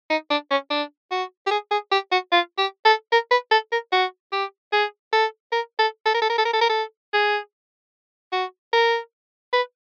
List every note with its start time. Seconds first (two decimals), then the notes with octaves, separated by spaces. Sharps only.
0.10 D#4
0.30 D4
0.51 C#4
0.70 D4
1.11 F#4
1.46 G4
1.51 G#4
1.71 G#4
1.92 G4
2.11 F#4
2.32 F4
2.58 G4
2.85 A4
3.12 A#4
3.31 B4
3.51 A4
3.72 A#4
3.92 F#4
4.32 G4
4.72 G#4
5.13 A4
5.52 A#4
5.79 A4
6.06 A4
6.14 A#4
6.22 A4
6.29 A#4
6.38 A4
6.45 A#4
6.53 A4
6.61 A#4
6.69 A4
7.13 G#4
8.32 F#4
8.73 A#4
9.53 B4